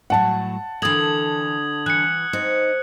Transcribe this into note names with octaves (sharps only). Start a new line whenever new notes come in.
A2 F#3 F#5 A5
D3 E3 A4 A#4 D#6 G#6 F#7
E3 F#6 C#7
C4 D#4